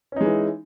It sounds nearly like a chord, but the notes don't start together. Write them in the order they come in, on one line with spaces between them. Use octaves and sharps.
C#4 D#4 G#3 E3